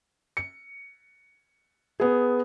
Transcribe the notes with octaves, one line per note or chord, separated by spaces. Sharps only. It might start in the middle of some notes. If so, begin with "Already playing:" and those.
C#7
B3 G#4